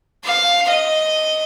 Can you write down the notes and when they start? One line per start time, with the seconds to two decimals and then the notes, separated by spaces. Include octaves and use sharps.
0.24 F5
0.68 D#5